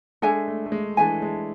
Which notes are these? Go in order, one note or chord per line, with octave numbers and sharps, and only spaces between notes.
G#3 D4 A4 E5 G#5
A3
A3
G#3
E3 D4 A4 E5 G#5
G#3